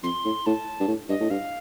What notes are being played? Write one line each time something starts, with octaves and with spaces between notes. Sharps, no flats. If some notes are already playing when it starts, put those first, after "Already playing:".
F2 C6
A2
A2 A5
G2
A2
G2 D#5
A2
G2 F5